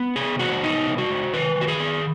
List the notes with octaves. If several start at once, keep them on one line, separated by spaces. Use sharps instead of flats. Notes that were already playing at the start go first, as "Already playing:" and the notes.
Already playing: B3
C#3 G#4
G#3 F#4
B3 D#4
C#3
F#4
G#3
D#3 B4
D#3
F#4
G#4
B3